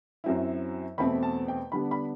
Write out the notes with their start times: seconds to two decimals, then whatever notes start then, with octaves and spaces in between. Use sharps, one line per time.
0.24 F#2 F#3 C4 E4
0.98 E2 B2 A3 C4 B5
1.23 A5
1.48 G5
1.72 D3 G3 B3 D4 B5
1.91 B5